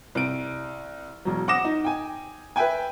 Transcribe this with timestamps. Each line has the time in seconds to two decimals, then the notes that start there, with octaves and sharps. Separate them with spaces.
0.15 C2 D7
1.25 E1 F#3
1.48 F#5 D6 D#6 A#6 E7
1.64 D#4
1.84 G5 G#5
2.56 B4 E5 G5 G#5